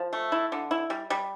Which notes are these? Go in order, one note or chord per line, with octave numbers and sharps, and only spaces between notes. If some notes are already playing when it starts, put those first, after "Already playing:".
Already playing: F3
A3
E4
D3
E4
G3
G3